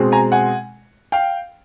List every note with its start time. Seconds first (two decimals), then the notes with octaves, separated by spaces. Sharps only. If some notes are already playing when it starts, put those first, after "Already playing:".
Already playing: B2 G#3 C4
0.12 G#5 A#5
0.32 F#5 G#5
1.12 F5 G5